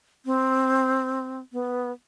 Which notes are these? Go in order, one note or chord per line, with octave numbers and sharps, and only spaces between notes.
C4
B3